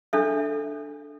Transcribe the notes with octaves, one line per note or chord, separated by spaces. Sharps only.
D4 A4 E5